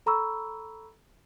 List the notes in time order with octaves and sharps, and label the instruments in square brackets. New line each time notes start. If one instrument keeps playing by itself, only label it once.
[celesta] A4 A#5 B5 C#6 E6